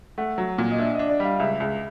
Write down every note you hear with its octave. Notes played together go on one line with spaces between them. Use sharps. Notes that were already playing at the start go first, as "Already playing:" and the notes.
A3 F#5
F#3
A#2
D#5
D4 E5
D#5
D4
D5
G3 F5
C#2 E5
C#2